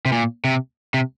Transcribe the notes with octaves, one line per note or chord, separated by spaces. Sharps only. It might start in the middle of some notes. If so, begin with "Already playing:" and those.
C3
A#2
C3
C3